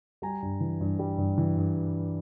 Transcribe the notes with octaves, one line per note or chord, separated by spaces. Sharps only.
G3 G#5 A#5
G2
E3
G2
G3
G2
E3
G2